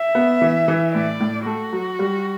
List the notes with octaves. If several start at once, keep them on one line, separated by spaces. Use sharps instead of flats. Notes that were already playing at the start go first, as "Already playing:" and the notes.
Already playing: E5
B3
E3
E3
A2 D5
A2
A3 F#4
F#3
G3